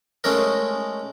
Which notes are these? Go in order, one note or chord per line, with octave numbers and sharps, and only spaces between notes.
G#3 A3 C#4 D#4 A#4